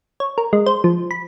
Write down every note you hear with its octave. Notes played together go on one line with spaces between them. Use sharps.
C#5
A#4
G#3
C5
F3
B5